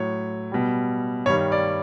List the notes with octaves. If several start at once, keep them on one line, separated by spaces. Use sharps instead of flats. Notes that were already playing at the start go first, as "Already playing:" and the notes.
Already playing: A2 F#3 C#5
B2 G3
G2 D#3 G3 C#5
D5